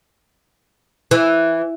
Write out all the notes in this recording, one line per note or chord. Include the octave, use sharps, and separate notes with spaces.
E3